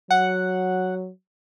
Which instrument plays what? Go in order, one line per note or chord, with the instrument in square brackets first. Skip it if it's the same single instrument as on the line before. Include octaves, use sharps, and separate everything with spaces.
[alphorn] F#3 [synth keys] F#5